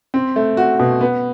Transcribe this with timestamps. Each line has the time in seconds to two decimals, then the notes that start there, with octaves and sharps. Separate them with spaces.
0.14 C4
0.36 A3
0.57 F#4
0.80 B2
1.01 B3